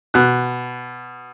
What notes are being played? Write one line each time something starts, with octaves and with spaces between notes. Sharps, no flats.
B2 F#6